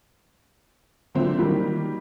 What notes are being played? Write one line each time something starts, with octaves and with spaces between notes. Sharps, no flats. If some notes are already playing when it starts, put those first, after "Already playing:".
A#2 D3 F#3 A3 C4
D#3 F#3 G3 A#3